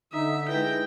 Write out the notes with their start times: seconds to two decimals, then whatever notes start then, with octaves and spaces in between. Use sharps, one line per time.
0.13 D3 D#4 E5 D#6
0.48 G#3 D#4 E4 B4 G5 A#6